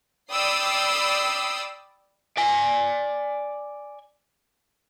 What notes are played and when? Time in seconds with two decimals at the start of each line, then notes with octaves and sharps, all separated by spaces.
0.33 D5 G5 B5 D#6 E6 C7
2.37 D5 G#5